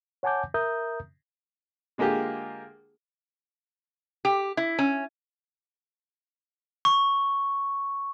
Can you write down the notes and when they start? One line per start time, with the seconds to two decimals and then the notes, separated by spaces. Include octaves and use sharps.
0.23 C#5 F#5 G#5 A5 D6 G6
0.54 A#4 E5 A#5 D#6 G6
1.98 D3 G#3 A#3 F4 G4 G#4
4.25 G4
4.57 E4
4.79 C#4
6.85 C#6